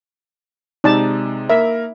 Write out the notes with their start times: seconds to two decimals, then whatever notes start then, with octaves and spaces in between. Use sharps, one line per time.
0.84 C3 G#3 D#4 D5 A5
1.50 A#3 A#4 E5